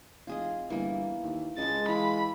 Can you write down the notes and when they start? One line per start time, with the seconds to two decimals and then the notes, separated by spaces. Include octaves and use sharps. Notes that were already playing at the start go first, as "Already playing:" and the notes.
0.27 F1 F4 G#4 D#5
0.70 G1 E3 A#3
1.23 D#2
1.58 C#2 G#3 D#5 A5 A6
1.88 E3 F5 B5